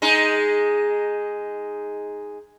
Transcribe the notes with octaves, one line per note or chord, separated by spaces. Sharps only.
G#3 D#4